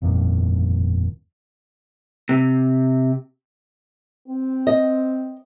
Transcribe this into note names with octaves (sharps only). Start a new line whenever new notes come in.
G1 F2 A#2 D#3
C3
C4
D#5